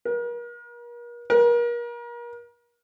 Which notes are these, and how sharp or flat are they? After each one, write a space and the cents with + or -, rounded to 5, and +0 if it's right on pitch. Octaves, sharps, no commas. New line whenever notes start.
A#4 +40
A#4 +35